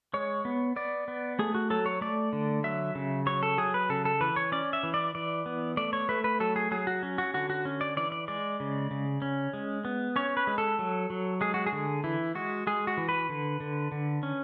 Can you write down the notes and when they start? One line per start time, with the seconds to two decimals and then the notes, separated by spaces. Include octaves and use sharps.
0.14 G#3 C#5
0.45 B3
0.76 B3 D5
1.08 B3
1.39 A3 G#4
1.55 F#4
1.70 F#3 A4
1.86 C#5
2.01 A3 D5
2.33 D3
2.64 F#3 E5
2.95 C#3
3.26 F#3 C#5
3.43 A4
3.58 F#3 G#4
3.74 B4
3.89 C#3 A4
4.05 A4
4.21 E3 B4
4.36 C#5
4.52 C#4 D5
4.73 E5
4.83 E3
4.94 D5
5.15 E3 D5
5.46 B3
5.77 A3 D5
5.93 C#5
6.09 A3 B4
6.24 B4
6.40 F#3 A4
6.56 G#4
6.71 F#3 G#4
6.87 F#4
7.03 C#4
7.18 F#4
7.34 D3 F#4
7.50 F#4
7.65 C#4
7.81 D5
7.97 E3 D5
8.12 D5
8.28 G#3 D5
8.60 C#3
8.91 C#3
9.22 C#4
9.53 G#3
9.85 B3
10.16 C#4 C#5
10.37 B4
10.47 G#3
10.58 A4
10.79 F#3
11.10 F#3
11.41 G#3 G#4
11.54 F#4
11.67 G#4
11.72 D3
12.04 E3 E4
12.35 G#3 F#4
12.67 G#3 G#4
12.87 F#4
12.97 E3
13.09 B4
13.29 D3
13.60 D3
13.92 D3
14.23 C#4